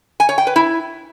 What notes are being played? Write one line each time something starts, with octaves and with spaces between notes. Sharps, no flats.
G#5
C#5
G5
B4
E4